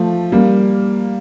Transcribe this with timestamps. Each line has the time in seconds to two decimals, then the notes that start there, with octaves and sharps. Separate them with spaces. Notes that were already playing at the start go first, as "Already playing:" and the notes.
Already playing: F3 A3
0.32 G3 A#3